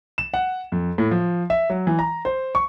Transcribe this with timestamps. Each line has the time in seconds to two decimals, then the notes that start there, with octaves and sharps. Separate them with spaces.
0.18 E7
0.34 F#5
0.72 F2
0.98 A2
1.11 F3
1.50 E5
1.70 F#3
1.87 E3
1.99 A#5
2.25 C5
2.55 C#6